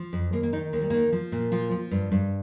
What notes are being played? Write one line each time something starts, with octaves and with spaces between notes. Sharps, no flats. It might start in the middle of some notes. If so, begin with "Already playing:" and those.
Already playing: F3
F2
D#2 A#3
A#3
D#3 D#4
D#2 A#3
G3
D#3 A#3
F3
A#2
F3 F4
F3
G2
G2